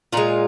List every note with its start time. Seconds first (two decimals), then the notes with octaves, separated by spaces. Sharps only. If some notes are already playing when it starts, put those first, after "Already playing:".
0.12 A#2 G#3 F4